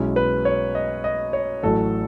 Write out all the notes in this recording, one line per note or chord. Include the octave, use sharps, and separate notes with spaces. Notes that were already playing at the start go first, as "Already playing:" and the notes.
Already playing: B1 B2 G#3 C#4 E4
B4
C#5
D#5
D#5
C#5
A1 A2 F#3 A4